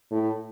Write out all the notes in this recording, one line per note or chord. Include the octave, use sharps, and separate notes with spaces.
A2